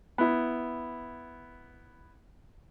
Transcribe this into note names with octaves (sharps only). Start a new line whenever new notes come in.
B3 E4